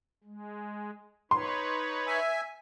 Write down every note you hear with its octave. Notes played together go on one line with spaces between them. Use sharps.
G#3
D#4 B4 C#5 C6
E5 G#5